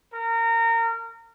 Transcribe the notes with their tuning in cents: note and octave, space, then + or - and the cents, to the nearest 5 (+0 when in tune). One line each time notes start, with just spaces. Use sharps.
A#4 -25